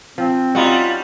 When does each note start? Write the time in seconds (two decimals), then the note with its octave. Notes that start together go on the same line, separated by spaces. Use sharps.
0.18 F3 C4
0.55 G3 C#4 D#4 F4 F#4